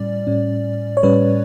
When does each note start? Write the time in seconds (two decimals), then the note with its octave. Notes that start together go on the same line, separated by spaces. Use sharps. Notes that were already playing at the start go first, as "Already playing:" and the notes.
Already playing: A2 G3 C#4 D5
0.27 A2 G3 C#4
0.97 C#5
1.03 A2 G3 C#4 B4